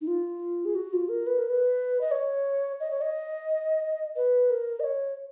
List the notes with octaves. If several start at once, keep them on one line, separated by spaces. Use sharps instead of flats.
D#4
F4
G#4
F#4
F4
A#4
B4
A#4
B4
D#5
C#5
D#5
C#5
D#5
B4
A#4
D#5
C#5